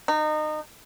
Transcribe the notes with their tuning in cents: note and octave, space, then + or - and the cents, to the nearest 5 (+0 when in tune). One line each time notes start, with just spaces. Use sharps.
D#4 -25